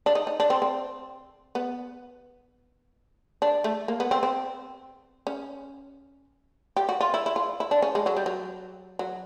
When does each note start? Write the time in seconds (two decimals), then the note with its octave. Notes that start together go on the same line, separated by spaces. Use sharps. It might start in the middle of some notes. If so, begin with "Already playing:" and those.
0.06 D4
0.15 D#4
0.27 D#4
0.40 D4
0.50 C4
0.62 C4
1.55 B3
3.42 D4
3.64 A3
3.88 A#3
4.00 B3
4.11 C4
4.23 C4
5.27 C#4
6.76 G4
6.89 F#4
7.01 F4
7.14 E4
7.26 E4
7.36 F4
7.60 E4
7.71 D4
7.82 C#4
7.95 G#3
8.06 F#3
8.17 G3
8.26 F#3
8.99 F#3